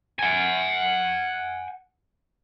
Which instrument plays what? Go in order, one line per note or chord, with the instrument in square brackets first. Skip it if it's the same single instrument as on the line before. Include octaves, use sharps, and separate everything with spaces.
[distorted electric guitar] F#5 G#5